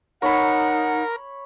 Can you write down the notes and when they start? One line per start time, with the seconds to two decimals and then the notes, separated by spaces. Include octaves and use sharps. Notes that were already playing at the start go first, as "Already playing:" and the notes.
0.22 D#4 A#4 C#5 F#5 B5